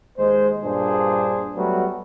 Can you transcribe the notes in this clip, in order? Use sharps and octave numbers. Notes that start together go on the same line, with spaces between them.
D#2 G#3 C5
G2 A#2 D4 G#4 C5
F#3 G3 A3 B3 F#4